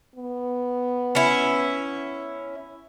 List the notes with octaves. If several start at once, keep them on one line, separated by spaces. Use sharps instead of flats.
B3
C#4 E4